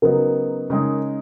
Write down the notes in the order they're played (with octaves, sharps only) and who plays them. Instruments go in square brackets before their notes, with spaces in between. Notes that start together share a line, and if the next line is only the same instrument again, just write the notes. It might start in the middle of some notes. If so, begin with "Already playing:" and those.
[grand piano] C#3 F#3 B3 D#4 [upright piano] A#4
[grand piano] C#3 G#3 D#4